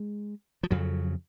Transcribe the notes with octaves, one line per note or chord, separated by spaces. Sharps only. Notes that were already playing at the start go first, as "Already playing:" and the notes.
Already playing: G#3
F3
F2 C#3 F#3